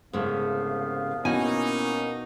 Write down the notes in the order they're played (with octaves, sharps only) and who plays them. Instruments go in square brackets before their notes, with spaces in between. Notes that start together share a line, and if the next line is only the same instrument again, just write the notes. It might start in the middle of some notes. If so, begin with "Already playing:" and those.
[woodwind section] C2 B3 F5 [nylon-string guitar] G#2 C#3 A3
[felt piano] B2 [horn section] A#3 C#4 D#4 [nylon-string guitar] E4 F#5 G#5